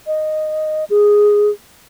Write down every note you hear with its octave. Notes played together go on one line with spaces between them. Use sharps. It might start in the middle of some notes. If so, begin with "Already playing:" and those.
D#5
G#4